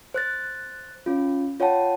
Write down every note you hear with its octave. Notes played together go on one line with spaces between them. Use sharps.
C5 F#6 A6
C#4 F4
F4 C#5 F#5 G5 A5